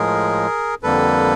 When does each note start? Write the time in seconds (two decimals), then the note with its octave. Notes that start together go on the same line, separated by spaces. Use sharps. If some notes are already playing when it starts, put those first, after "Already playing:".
Already playing: A2 F3 G#3 G#4 A#4
0.83 F2 D3 G3 A#3 A4 B4